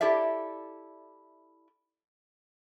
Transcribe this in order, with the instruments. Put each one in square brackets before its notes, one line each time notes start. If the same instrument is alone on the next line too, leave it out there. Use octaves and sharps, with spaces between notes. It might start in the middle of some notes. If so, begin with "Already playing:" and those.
[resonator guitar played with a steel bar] E4 G4 A4 D5 E5